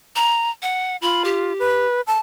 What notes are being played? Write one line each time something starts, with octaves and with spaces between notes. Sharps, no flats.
A#5
F#5
F4 B5
G4
B4
A5